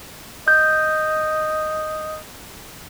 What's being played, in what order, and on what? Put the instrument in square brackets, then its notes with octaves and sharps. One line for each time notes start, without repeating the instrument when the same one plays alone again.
[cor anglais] D#5 [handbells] G6